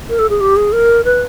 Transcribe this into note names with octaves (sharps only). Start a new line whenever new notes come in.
A#4
A4
G#4
G4
G#4
A#4
B4